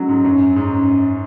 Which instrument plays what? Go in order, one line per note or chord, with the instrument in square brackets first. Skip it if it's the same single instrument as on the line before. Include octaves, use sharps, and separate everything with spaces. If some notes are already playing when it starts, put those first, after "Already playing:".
Already playing: [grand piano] F#3 G#3 A3 [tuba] C#4
[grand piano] G#2
F#2
[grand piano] G#2 [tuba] C#4